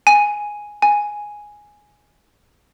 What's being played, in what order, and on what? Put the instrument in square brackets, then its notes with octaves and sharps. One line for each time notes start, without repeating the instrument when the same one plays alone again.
[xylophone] G#5
G#5